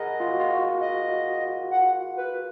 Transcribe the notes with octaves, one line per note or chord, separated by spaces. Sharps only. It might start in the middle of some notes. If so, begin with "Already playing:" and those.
Already playing: G#4 A#4 D#5 F#5 A#5 B5
F4
F#4
F4
F#4
D#5
F#5
B4